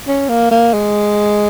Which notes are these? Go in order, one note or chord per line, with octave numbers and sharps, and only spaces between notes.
C#4
A#3
A#3
G#3